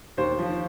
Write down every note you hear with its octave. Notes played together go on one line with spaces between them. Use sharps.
D#2 C5
F3